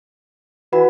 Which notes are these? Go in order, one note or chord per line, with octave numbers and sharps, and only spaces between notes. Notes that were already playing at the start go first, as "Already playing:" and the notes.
E3 F#4 F#5 B5